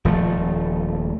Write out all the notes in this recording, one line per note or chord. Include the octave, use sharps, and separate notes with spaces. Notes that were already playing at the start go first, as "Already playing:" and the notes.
D#1 F3 A3